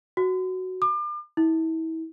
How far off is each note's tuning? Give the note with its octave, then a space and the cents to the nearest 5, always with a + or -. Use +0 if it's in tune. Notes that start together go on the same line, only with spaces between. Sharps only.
F#4 +5
D6 +35
E4 -35